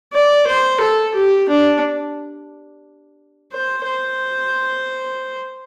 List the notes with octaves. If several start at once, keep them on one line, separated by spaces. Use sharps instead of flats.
D5
C5
A4
G4
D4
C5
C5